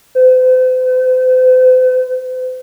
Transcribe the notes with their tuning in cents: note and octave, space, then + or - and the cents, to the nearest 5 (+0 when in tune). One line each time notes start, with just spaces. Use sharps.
C5 -40